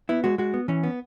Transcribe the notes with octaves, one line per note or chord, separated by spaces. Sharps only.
B3 E4
G#3 F#4
G#3 F#4
B3
E3 C#4
B3